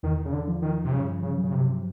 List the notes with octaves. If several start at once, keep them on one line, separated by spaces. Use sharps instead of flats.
E2 D#3
C#3
D3
F3
D#3
C3
G2 C#3
C#3
F#3
C#3
C3